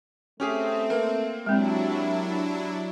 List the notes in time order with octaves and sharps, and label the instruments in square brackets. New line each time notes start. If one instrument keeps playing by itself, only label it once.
[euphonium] A3 [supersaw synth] C4 [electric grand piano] C#4 G4 G#4
[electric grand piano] A#3 [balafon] B4
[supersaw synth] F#3 D4 E4 [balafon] G#3 C4 [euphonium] G4